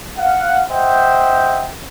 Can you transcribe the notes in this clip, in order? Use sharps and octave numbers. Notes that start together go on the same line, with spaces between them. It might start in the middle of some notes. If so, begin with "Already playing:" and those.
F5 F#5
C5 D#5 E5 F#5 G5